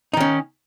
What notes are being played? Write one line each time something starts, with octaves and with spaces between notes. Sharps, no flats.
D#3 C#4 D#4